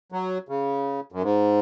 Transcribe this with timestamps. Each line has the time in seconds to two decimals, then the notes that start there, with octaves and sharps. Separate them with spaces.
0.12 F#3
0.49 C#3
1.12 F#2
1.22 G#2